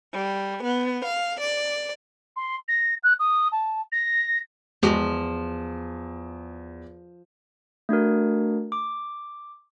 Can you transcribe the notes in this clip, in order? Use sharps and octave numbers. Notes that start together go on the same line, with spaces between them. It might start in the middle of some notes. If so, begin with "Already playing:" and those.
G3
B3
F5
D5
C6
A#6
F#6
D#6
A5
A#6
E2 F3 G#3 F#4 G4
A3 D4 F#4 A#4
D6